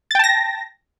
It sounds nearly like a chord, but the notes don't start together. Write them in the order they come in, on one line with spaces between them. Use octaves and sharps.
A6 G5 A5 A#6